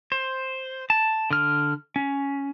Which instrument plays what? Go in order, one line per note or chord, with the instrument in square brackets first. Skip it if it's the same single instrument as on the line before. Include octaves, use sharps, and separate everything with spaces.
[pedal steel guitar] C5
A5
D3 F6
C#4